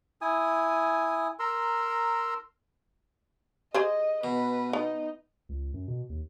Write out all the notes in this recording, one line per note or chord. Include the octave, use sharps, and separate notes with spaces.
E4 G#5 D#6
A#4 A#5 C6 E6
G4 G#4 C5 D#5
B2 B4
B3 D#4
C#2
F#2
B2
D#2